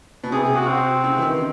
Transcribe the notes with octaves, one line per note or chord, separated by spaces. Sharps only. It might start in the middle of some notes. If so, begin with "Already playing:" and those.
B2
C3 G#4
G#4
F#4
C4
C#3
E3
D#3